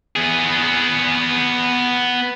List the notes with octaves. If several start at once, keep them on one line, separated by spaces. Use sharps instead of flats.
B3 G#4